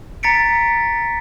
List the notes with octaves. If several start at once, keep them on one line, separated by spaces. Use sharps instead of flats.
A#5 A6 B6 C#7 D7